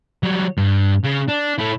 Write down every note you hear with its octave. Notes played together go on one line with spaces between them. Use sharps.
F#3 G3
G2
C#3
D4
A3 E4